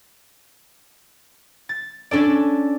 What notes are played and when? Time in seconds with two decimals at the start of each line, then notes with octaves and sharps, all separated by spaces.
1.69 A6
2.11 C#4 D4 A4 D5